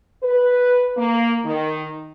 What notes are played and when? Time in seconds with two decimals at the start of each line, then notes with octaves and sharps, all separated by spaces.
0.23 B4
0.97 A#3
1.45 D#3